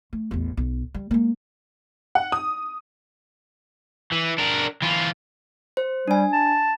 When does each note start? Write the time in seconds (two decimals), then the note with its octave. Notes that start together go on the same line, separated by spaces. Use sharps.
0.13 A3
0.31 A1 E2
0.57 B1
0.94 G3
1.11 G#3 A#3
2.15 F#5
2.32 D#6
4.12 E3
4.38 D4 A#4
4.82 E3 F4
5.77 C5
6.08 G3 D4 G#5
6.33 A5